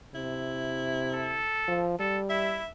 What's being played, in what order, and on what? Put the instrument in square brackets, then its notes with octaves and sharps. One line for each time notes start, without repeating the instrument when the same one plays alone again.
[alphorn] C3 [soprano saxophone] E4
[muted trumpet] A4
[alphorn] F3
[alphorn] G3 [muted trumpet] A4
[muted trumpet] E4 [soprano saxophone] E5